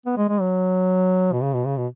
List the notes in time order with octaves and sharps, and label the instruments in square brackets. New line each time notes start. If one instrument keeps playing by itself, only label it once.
[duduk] B3
G#3
G#3
F#3
B2
C#3
B2
C#3
B2